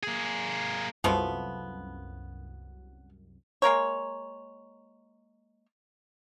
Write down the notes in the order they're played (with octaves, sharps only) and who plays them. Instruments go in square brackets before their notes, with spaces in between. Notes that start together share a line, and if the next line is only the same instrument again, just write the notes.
[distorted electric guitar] A#3 G#4
[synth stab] C2 F#2 [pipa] F3 A3 B3
[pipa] G#3 A#3 A#4 C#5